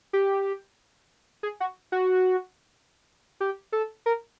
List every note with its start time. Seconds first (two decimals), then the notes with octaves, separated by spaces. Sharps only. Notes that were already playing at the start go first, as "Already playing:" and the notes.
0.13 G4
1.43 G#4
1.60 F#4
1.92 F#4
3.40 G4
3.72 A4
4.06 A#4